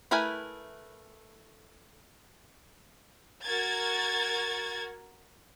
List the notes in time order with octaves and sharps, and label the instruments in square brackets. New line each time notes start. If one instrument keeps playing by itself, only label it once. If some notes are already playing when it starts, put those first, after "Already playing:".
[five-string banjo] A3 E4 A#4 B4 G#5
[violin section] F#4 A#4 G#6 A6